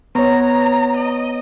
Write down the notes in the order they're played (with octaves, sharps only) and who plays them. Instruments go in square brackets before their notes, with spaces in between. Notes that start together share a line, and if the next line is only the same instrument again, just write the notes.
[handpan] B3 C#5 [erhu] A#5
[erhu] D#5